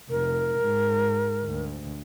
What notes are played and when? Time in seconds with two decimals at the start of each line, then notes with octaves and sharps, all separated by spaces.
0.10 F1 A#4
0.60 G#2
1.44 D2